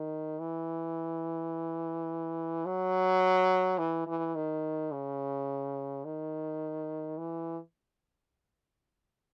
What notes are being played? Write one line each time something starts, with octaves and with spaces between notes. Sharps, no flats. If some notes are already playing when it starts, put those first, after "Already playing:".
Already playing: D#3
E3
F#3
E3
E3
D#3
C#3
D#3
E3